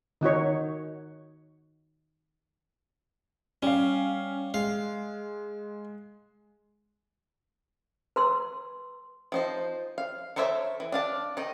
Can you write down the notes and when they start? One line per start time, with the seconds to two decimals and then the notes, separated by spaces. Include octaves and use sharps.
0.21 D#3 D#4 F#4 C#5
3.63 G3 C#4 F5
4.54 G#3 F5
8.16 B4 C6 E6
9.32 F3 D#4 C5
9.98 F5
10.36 A4 A#4 C5 C#5 E5
10.80 E3
10.92 D4 F5 A5
11.37 D#3 D#4